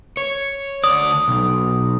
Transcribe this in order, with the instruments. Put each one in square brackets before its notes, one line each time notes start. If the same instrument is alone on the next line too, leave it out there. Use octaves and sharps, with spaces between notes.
[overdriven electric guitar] C#5
[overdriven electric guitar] D2 D5 [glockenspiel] D#6
[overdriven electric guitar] B1